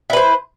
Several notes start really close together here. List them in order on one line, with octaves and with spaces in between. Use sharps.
E4 B4 C5